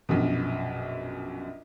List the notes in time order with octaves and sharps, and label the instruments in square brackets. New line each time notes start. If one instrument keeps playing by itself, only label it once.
[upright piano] A#1 F#2 B2